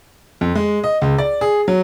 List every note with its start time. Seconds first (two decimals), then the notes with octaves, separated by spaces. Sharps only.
0.41 F2
0.55 G#3
0.84 D#5
1.02 C#2
1.18 D5
1.41 G#4
1.68 F#3